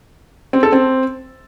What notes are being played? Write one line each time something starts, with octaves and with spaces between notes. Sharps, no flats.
C4
A4
C4